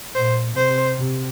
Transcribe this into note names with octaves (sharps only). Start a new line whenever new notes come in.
A#2 C5
C3 C5
C3